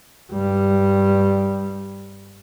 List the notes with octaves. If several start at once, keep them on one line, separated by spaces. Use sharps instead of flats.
G2 G3